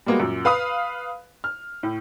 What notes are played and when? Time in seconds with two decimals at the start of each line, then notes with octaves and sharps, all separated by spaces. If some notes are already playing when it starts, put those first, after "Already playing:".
0.06 G3 G#3 A#3 B3 F#4
0.20 F#2 A#2
0.45 B4 F5 B5 D#6
1.44 F6
1.83 A2